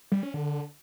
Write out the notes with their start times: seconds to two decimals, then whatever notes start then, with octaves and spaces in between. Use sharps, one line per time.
0.12 G3
0.23 C#4
0.34 D3